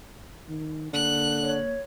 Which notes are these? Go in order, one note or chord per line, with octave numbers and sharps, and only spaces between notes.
D#3
D3 A#3 F#6
C#5